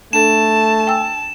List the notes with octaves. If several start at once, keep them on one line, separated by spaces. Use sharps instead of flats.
A3 D4 A4 A5 E7
G5 G#5 E6